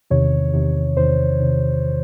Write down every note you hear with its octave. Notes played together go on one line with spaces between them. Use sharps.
E2 C3 D#3 C#5
E2 C3 D#3
E2 C3 D#3 C5
C3 D#3